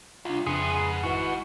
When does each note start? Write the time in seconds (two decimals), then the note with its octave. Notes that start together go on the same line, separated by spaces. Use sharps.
0.25 C2 D4 F4
0.47 F2 A2 C#3 F3 G#4 B4 C#7
0.74 G#2
1.03 G#1 E4 F#4 B4